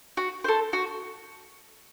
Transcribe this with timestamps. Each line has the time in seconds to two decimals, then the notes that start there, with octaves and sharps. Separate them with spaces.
0.17 F#4
0.44 A4 C5
0.73 F#4